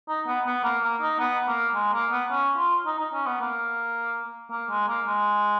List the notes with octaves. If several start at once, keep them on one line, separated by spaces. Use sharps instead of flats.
D#4
B3
B3
A#3
A#3
D#4
B3
A#3
G#3
A#3
B3
C#4
F4
D#4
D#4
C#4
B3
A#3
A#3
G#3
A#3
G#3